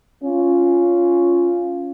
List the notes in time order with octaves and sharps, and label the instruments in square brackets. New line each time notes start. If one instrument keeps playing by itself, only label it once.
[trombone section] C#4 F4